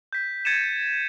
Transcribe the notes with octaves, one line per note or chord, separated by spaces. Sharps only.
G6 B6
G#6 A6 C#7 D#7 E7